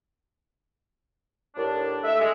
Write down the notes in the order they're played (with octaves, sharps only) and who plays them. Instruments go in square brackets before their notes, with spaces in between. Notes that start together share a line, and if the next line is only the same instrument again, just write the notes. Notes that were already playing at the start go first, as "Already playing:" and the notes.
[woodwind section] D#2 A2 D4
[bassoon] A3 [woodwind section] E5
[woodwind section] G#3